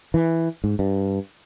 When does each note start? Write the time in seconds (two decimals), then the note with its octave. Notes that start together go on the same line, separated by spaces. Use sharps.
0.14 E3
0.64 G#2
0.79 G2